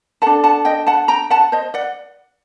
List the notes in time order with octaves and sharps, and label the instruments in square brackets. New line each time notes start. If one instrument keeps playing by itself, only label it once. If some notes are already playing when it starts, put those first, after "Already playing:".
[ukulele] D4 A4 F#5 A5
F#5 A5
D#5 G5
F#5 A5
G5 A#5
F#5 A5
C5 D#5
D5 F#5